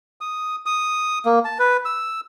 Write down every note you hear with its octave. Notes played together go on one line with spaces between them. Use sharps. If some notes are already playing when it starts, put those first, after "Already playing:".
D#6
D#6
A#3
A5
B4
E6